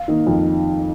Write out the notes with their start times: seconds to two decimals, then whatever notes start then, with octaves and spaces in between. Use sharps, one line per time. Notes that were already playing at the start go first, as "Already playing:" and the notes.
Already playing: F5
0.08 D#3 A#3 D#4
0.27 F2